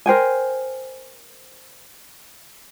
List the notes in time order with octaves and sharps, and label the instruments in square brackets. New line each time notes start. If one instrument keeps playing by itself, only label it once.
[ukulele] A#4 C5 G5 G#5